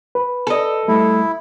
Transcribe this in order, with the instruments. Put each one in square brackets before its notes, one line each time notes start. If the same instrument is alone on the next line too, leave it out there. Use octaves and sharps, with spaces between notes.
[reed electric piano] B4
[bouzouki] A4 D#5
[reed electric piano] G3 A3 [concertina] E4